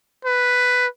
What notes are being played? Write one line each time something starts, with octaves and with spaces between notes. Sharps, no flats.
B4